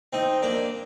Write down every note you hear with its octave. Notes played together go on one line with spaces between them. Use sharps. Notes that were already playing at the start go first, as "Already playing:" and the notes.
C4 D#4
A#3 D4